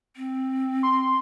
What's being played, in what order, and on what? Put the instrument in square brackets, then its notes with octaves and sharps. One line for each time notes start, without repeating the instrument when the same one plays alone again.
[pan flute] C4
[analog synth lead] C6